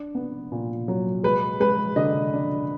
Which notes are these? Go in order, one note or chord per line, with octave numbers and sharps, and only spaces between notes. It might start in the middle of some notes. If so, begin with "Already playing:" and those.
Already playing: D4
B3
A#2
F#3
G#3 B4
G#3 B4
D3 D#5
D4